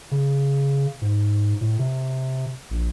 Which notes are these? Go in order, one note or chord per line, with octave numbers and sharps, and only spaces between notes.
C#3
G#2
A2
C3
A#1